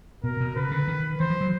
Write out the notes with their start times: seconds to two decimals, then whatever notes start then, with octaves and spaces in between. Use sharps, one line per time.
0.24 B2 A#4
0.40 B2
0.56 C#3 B4
0.71 D3
0.88 D#3
1.20 E3 C5
1.30 F3
1.41 F#3